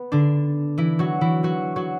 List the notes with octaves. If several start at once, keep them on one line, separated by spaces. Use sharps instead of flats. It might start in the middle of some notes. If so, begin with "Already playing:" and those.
Already playing: B3
D3 D4
E3 E4
F#3 F#4
E3 E4
F#3 F#4
F#3 F#4